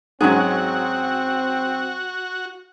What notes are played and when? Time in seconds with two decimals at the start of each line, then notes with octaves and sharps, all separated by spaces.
0.21 G#2 F#3 G#3 C4 C#4 F#4 G#4